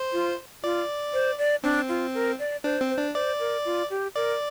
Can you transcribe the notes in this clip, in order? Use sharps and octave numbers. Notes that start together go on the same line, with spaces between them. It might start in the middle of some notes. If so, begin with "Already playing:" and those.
Already playing: C5
F4
F4 D5
C5
D5
C4 D4
F4
A#4
D5
D4 C5
C4
C5
D4
C5 D5
A#4
F4
G4
A#4 D5